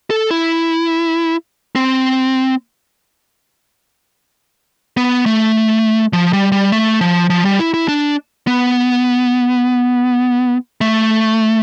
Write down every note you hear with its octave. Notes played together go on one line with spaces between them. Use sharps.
A4
E4
C4
B3
A3
F3
G3
G3
A3
F3
F3
G3
E4
E4
D4
B3
A3